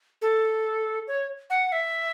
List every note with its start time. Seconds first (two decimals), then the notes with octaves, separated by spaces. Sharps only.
0.22 A4
1.07 C#5
1.50 F#5
1.72 E5